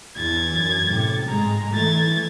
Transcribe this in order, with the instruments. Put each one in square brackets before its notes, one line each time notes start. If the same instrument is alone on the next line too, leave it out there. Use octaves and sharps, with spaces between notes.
[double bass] E2 E3 [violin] G#6 A6
[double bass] F#2
A2 C3
[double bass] G#2 G#3 [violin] A#5
[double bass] E3 A3 [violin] G#6 A6